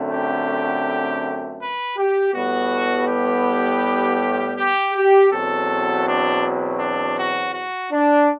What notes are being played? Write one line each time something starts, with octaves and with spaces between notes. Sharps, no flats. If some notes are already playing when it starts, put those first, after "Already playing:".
Already playing: F#2 D3 A3 C4
G4
B4
G4
A2 G3 B3 F#4
G4
G4
G4
E2 B2 F#3 C4 A4
D4
D4
F#4
F#4
D4